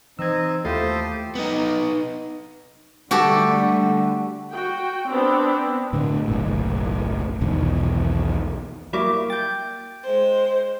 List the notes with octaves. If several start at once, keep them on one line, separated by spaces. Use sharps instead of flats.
E3 C4 D#4 E6 G#6
D#2 A3 E4 F4 G4 A4 C5 D#6
B3 D#4
D3 G3 A3 F#4 G4 A4
F#4 G5
B3 C4 D4
A2 D3
F#1 B1 A2
B1 E2 B2 D#3
F#3 G3 A#3 E4 A#4 D6
G5 G6 A6
G#3 C5